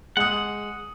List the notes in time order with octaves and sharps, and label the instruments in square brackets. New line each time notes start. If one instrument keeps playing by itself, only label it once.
[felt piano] G#3 D#6 [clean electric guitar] F#5